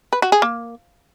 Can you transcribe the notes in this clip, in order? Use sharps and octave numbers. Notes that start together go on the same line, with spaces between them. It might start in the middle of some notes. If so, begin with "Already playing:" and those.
B4
F#4
G#4
A#3